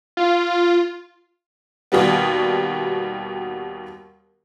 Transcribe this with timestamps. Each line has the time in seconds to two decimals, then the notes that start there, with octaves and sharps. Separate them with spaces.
0.17 F4
1.92 D#2 B2 G3 B3